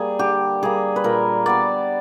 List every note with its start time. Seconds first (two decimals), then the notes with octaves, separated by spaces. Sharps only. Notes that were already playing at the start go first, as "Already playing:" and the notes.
Already playing: G3 A#3 G#4
0.19 D3 G4
0.63 G3 A#3 G#4
0.96 B4
1.04 A#2 A#4
1.46 G3 B3 D5